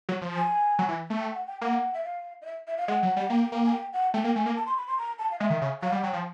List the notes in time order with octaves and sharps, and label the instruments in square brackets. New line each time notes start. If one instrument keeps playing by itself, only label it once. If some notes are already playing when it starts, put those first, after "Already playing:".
[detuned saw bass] F#3
F3
[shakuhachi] G#5
[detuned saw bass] F#3
E3
A3
[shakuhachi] G5
F#5
G5
[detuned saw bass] A#3 [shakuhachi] F#5
[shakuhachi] E5
F5
D#5
E5
E5
F5
[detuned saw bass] G#3 [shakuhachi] F#5
[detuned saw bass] F#3
G3
[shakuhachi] F#5
[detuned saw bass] A#3 [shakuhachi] G5
[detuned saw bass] A#3
[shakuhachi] G#5
G5
F#5
[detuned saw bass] A3 [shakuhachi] G5
[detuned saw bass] A#3
[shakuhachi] G5
[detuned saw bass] A3 [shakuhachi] G#5
[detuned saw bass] A#3
[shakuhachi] A5
C6
B5
C6
A#5
A5
F5
[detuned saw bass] G#3 [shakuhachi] E5
[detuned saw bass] D#3
C#3
[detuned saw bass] F#3 [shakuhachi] F5
[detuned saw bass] G3
[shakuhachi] F#5
[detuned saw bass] F#3 [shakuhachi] G5
[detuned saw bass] F3